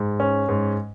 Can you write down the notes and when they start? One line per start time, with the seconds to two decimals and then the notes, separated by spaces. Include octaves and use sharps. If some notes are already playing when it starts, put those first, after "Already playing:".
Already playing: G#2
0.20 C#4
0.49 G#2